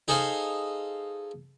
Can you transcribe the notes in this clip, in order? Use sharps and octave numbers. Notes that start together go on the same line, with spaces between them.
D#4 G#4 A4 C5 F5